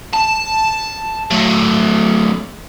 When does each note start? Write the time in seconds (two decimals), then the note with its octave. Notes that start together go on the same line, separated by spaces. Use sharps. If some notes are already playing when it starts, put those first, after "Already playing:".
0.14 A5
1.31 F#3 A3